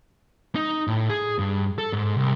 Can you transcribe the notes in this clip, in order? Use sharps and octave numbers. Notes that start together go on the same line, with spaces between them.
D#4
A2
G#4
G2
A4
G#2
C2